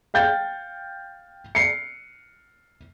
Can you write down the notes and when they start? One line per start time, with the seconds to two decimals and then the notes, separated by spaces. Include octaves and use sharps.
0.14 F5 G5 G6 A6
1.55 C7 C#7